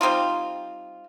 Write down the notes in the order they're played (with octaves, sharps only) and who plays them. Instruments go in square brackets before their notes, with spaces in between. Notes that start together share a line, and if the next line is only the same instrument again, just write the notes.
[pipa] G3 C4 D#4 F4